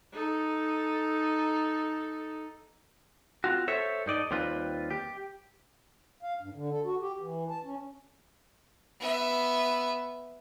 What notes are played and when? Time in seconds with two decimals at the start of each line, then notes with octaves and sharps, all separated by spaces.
0.12 D#4 A4
3.44 C4 F4 F#4
3.68 A4 C5 C#5 E5
4.06 G2 D#4 D5 D#5
4.31 D#2 G3 C4 F4 B4
4.91 G4
6.23 F5
6.41 G2
6.55 D3
6.71 A4
6.85 F#4
7.01 G4
7.20 E3
7.50 A5
7.64 C#4
9.00 B3 E5